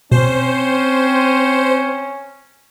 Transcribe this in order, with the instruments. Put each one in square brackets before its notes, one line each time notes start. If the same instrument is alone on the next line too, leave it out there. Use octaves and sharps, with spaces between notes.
[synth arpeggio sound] B2 [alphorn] C4 [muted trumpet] C#4 [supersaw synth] C5